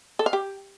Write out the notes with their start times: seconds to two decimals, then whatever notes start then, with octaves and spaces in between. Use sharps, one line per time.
0.19 A4
0.26 F5
0.33 G4